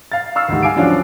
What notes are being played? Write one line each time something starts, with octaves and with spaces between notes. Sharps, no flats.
F5 A6
F5 C#6 E6 F6 C7
D2 G#2 D#3 G3
F5 G#5 D6 C7 D7
F3 F#3 C#4 D4 F4